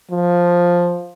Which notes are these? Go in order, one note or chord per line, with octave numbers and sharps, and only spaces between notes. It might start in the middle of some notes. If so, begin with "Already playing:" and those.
F3